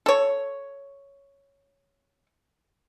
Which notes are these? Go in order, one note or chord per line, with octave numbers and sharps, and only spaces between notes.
A4 C#5